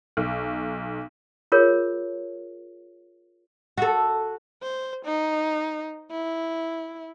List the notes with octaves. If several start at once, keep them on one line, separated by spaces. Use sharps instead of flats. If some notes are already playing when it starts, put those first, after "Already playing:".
B1
F4 G#4 A#4 C#5
F#4 A4
C5
D#4
E4